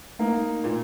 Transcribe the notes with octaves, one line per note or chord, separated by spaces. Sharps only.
A#3 D#4
A#2